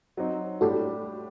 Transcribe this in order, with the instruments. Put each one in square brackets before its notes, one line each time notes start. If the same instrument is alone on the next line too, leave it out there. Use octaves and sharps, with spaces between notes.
[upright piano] F#3 C4 D#4
[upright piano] A2 G3 D4 G4 [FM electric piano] F#4 A4